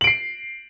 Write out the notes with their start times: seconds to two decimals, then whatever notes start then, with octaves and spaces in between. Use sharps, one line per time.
0.01 F#7
0.04 D7
0.07 C7